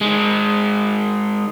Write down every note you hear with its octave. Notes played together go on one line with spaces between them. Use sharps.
D#3 G#3